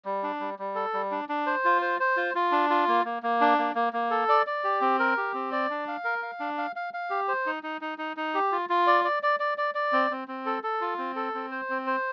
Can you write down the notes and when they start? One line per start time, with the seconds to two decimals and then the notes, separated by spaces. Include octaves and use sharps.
0.05 G3
0.23 D4
0.40 G3
0.59 G3
0.75 A4
0.94 G3
1.11 D4
1.29 D4
1.46 C5
1.65 F4
1.82 C5
2.00 C5
2.17 F4
2.35 F4
2.52 D4
2.70 F4
2.88 A#3
3.05 A#3
3.23 A#3
3.41 D4
3.58 A#3
3.75 A#3
3.93 A#3
4.11 A4
4.29 D5
4.47 D5
4.64 G4
4.81 C4
4.99 A#4
5.17 G4
5.34 C4
5.52 D5
5.70 D4
5.88 F5
6.04 A#4
6.23 F5
6.40 D4
6.58 F5
6.76 F5
6.94 F5
7.10 G4
7.28 C5
7.46 D#4
7.63 D#4
7.81 D#4
7.98 D#4
8.17 D#4
8.34 G4
8.52 F4
8.69 F4
8.87 D5
9.04 D5
9.23 D5
9.40 D5
9.58 D5
9.75 D5
9.93 C4
10.11 C4
10.28 C4
10.46 A4
10.63 A4
10.81 F4
10.98 C4
11.16 A4
11.35 C4
11.51 C5
11.70 C4
11.87 C5